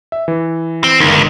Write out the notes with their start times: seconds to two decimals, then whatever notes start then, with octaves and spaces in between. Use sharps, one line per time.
0.12 E5
0.28 E3
0.84 C4
1.00 G1 C#2 D#3